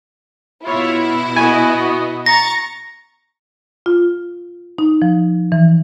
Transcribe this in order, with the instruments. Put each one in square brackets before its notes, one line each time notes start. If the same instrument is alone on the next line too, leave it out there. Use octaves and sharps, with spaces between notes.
[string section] B2 E4 [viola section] F4 C#5 E5
[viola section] B3 F#4 D#5 [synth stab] G#5
[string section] A#5 C#6 A6 [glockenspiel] A#6
[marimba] F4
D#4
F3
E3